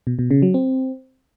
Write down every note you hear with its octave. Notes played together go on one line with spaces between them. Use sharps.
B2
B2
C#3
F#3
C4